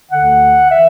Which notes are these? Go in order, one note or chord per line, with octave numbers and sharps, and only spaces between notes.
D2 D3 F#5
E3 E5